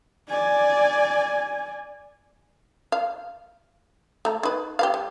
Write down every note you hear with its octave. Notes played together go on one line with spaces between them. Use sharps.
D5 G#5
F5
A3 A#5
D#3 B4
G4 B4 F5
G3